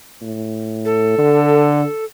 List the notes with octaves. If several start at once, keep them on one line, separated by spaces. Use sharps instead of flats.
A2
A4
D3